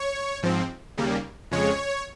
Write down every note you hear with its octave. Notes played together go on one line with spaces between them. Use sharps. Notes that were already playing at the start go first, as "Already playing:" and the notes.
Already playing: C#5
G#2 F3 C4
D#2 C#3 G3 A#3
F2 C#3 G#3 C#5